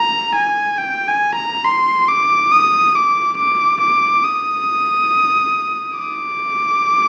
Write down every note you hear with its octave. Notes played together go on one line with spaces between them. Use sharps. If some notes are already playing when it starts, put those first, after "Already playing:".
Already playing: A#5
G#5
G5
G#5
A#5
C6
D6
D#6
D6
D6
D6
D#6
D6